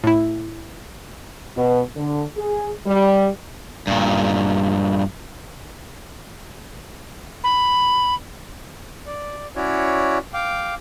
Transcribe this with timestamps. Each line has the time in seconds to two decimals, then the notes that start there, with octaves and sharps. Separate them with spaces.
0.04 A2 E4
1.57 B2
1.96 D3
2.37 G#4
2.86 G3
3.87 G2 A#2
7.44 B5
9.07 D5
9.56 C#4 E4 F#4 C#5 D5
10.34 F5 G5 D6